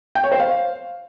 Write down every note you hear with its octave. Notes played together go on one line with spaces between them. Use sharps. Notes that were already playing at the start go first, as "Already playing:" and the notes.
G5
C#5
C5
F5